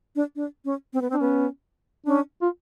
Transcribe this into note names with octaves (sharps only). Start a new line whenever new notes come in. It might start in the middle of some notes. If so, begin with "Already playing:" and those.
D4
D4
C#4
C4
B3
C4
D4
B3 C#4
C#4 D4
F4